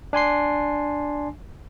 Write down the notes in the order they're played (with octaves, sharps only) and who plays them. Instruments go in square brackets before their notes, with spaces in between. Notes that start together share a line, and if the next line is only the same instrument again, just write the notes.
[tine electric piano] D4 G#5 C6 C7